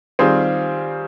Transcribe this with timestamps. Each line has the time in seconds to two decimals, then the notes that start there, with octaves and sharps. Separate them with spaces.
0.19 D#3 G3 C4 F4 G#4